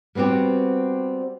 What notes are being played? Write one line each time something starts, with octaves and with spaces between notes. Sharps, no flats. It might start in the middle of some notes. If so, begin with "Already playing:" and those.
G3 B3 C4 F#4 G4